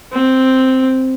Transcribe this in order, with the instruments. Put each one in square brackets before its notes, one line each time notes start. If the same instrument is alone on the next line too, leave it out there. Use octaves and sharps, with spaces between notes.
[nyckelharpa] C4